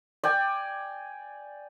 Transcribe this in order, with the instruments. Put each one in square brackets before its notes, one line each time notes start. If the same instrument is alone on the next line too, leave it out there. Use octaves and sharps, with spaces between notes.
[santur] D5 G5 G#5